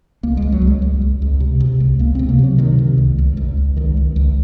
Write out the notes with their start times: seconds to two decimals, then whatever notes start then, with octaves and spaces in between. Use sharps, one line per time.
0.23 C#2 A#3
0.37 G#3
0.42 C#2
0.52 F#3
0.62 C#2
0.67 G#3
0.82 C#2
1.02 C#2
1.22 C#2
1.40 C3
1.60 C3
1.80 C#2
1.99 C#2 A#3
2.15 C3 C4
2.29 A#3
2.39 C3 F#3
2.58 C3 D#3
2.79 C3
2.98 C#2
3.19 C#2
3.37 C#2
3.57 C#2
3.77 C#2 D#3
3.97 C#2
4.16 C#2